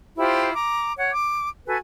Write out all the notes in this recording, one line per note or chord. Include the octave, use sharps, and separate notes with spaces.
E4 F4 G4 C5
A#5 D6
C#5 F#5
D6
F#4 A4 B4 G#5